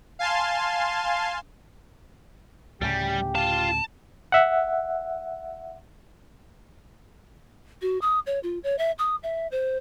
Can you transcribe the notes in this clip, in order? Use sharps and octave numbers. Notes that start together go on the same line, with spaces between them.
F5 G#5 A5 C6
D2 A2 C#3 G3 G4
F4 F5 A5
E5 F#5
F#4
D#6
C#5
F4
C#5
E5
D#6
E5
C5